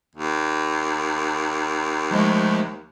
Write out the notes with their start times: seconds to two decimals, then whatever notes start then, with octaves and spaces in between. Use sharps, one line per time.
0.16 D#2
2.11 F3 G#3 A3